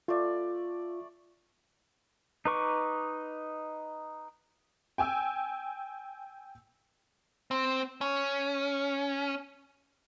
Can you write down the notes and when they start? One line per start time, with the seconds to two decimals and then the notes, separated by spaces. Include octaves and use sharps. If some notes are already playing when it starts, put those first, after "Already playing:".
0.08 A3 F4 D5
2.45 D#4 B4 C#6 D6
4.98 G5 G#5 E6
7.51 C4
8.01 C#4